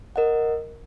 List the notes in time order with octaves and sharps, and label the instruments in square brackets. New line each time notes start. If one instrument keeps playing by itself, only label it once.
[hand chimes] A#4 D#5 F#5